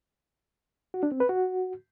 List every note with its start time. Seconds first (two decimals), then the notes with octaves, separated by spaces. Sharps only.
0.94 F#4
1.03 D4
1.12 C4
1.20 B4
1.29 F#4